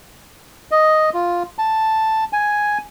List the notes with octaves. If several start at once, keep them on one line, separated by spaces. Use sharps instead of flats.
D#5
F4
A5
G#5